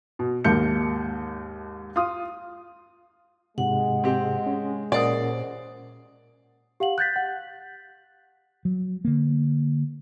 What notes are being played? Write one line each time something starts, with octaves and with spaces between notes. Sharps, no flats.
B2
D#2 G#2 A#3 A5 G6 C#7
F4 D#6
G#2 C3 G#3 F#5
C4 G4
C#4
A#2 C#4 A#4 C5 D5 F#5 D#6
G4 F5 F#5 F#7
F#6 G6 A6 B6
F#5
F#3
D3 A#3